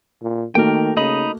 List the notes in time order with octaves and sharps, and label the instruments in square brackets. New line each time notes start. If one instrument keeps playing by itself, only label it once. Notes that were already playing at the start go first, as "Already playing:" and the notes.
[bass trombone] A#2
[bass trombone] D#3 [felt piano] A3 A#3 F#4 [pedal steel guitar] A#4 G5
[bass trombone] C#3 [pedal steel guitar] D#4 D#5 B5